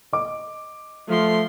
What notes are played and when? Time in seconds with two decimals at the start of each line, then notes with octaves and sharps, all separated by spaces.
0.13 D#5 D6
1.09 F3 A3 C6